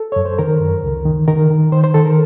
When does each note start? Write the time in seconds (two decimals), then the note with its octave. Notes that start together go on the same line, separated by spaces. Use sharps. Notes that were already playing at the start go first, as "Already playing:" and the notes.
Already playing: A4
0.12 F#2 C#5
0.25 C5
0.39 D#3 A#4
0.61 F#2
0.83 C#2
1.06 D#3
1.28 D#3 A#4
1.50 D#3
1.72 D#3 C5
1.84 C5
1.94 D#3 A4
2.05 A#4